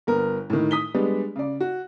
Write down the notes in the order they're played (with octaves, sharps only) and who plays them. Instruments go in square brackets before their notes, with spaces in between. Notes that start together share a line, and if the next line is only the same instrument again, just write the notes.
[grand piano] G1 B3 A#4
A2 D#3
D#6 B6 G7
G3 G#3 B3 D4
C#3 D5
F#4